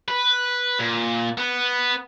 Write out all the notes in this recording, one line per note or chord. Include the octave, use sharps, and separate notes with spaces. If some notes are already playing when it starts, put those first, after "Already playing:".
B4
A#2
B3